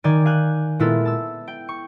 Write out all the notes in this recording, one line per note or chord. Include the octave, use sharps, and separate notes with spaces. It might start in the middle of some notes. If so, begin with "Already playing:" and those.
D#3 D5 G5 G#5 G#6
F5 G#5 F#6 G6
A#2 G#3 B3 E4 F4 A4
A5 E6
G5
C#6